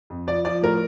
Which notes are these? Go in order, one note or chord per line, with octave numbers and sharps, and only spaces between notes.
F2
F3 D5
F3 D5
A2 A#4